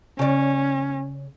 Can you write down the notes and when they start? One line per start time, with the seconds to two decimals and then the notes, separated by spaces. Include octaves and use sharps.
0.19 C#3 C#4 D5